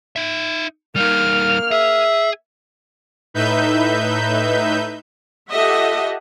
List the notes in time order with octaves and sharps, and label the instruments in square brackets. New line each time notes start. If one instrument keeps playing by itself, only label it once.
[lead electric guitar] D#4 E5
[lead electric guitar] G3 D#4 [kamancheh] A#3 F6
[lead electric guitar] G#4 [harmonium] E5
[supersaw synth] A2 D#4 B4 E5 G6
[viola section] F4 G4 A4 D#5 E5 F#5